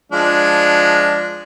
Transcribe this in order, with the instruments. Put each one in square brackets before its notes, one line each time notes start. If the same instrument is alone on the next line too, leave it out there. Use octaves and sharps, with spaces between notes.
[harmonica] F3 G#3 D4